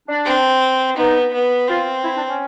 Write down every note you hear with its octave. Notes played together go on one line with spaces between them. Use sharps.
D4
C4
B3 D#4
B3
C4 F4
E4
D4
C#4